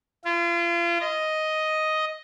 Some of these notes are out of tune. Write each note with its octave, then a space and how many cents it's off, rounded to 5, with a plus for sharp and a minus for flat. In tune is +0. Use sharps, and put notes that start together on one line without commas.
F4 -35
D#5 +5